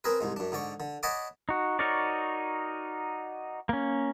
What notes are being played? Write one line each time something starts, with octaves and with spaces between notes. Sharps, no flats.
C4 G#4 A#4 B4
C2 G#2 G#3
F#2 D4
G#2 D3 D5 C#6
D3
C#5 D#5 F#5 A5 B5 D6
D#4 F#4
D#4 F#4 A#4 C#5 D5
A#3 C#4